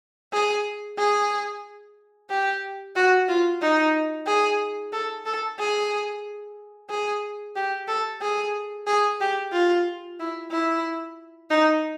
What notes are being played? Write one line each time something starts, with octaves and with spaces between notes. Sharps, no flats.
G#4
G#4
G4
F#4
F4
D#4
G#4
A4
A4
G#4
G#4
G4
A4
G#4
G#4
G4
F4
E4
E4
D#4